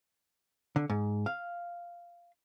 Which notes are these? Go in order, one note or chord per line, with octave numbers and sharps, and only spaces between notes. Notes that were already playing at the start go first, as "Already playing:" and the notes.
D3
G#2
F5